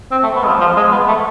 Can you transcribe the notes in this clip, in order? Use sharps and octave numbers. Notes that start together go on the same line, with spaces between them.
C4
A3
B3
G#3
F3
F3
G#3
B3
A3